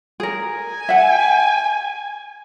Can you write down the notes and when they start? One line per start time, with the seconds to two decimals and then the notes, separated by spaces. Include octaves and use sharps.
0.20 G#4 A#4
0.52 G#5
0.89 E5 F#5